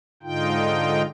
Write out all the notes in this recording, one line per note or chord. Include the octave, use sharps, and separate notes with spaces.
G#2 D3 D#4 F4 G5